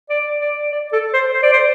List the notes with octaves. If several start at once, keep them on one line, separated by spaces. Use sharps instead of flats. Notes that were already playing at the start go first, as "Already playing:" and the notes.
D5
D5
D5
A4
C5
C5
D5
C5